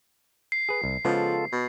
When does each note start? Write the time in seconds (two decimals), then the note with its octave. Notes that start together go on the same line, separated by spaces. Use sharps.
0.52 C7
0.69 G#4 B4
0.84 C2
1.05 C#3 F3 G#3 B3 F4 A4
1.52 B2